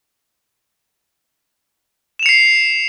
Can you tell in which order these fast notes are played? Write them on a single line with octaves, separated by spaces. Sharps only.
E7 F7 C#7 C7